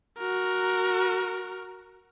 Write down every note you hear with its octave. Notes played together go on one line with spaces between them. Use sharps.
F#4 A#4